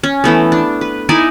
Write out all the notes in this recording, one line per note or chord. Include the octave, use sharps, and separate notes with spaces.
C#4
E3 A3 B3
D4
B4
D#4 E4 D5 G#5